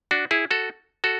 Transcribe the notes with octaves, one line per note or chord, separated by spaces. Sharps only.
D4 F#4
E4 G#4
F#4 A4
F#4 A4